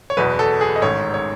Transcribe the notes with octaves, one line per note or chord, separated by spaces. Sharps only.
C#5
F#1 E2 B2 B4
A4
G#4
D#5
A1 G#2 D#3 C#5
C#5